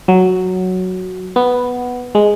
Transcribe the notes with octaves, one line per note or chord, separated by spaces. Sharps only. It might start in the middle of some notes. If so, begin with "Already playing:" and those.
F#3
B3
G#3